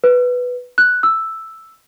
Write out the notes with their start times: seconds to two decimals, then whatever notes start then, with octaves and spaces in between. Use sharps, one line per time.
0.04 B4
0.78 F#6
1.03 E6